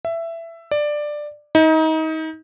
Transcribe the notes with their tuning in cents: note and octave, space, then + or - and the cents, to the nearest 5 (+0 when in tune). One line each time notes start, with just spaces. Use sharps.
E5 +15
D5 +10
D#4 +30